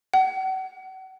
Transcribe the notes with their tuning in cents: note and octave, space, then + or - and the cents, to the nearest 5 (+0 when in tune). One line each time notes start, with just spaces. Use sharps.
F#5 +40